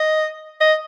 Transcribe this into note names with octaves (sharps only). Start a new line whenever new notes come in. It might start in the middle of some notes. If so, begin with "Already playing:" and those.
Already playing: D#5
D#5